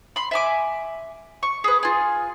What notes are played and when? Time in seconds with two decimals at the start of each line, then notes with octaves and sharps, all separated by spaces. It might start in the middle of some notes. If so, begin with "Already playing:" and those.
0.16 B5 C6
0.31 E5 G#5 D6
1.43 C#6
1.64 G#4 B4
1.83 F4 G#4